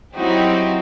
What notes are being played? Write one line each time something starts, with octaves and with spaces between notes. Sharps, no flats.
F#3 C4 D#4 E4 F#4 G4